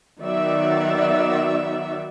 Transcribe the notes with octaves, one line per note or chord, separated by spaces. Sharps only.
D#3 F#3 B3 F#4 D5 E5